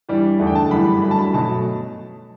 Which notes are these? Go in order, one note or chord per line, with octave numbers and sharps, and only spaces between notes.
G2 E3 G3 D5
E2 D3 A3
G5
A5
F#2 E3 G3 B5
G2 F#3 A3 B5
A5
B5
B2 F#3 A3 A5